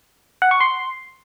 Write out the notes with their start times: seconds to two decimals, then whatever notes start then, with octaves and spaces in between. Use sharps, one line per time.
0.42 F#5
0.51 C#6
0.61 C6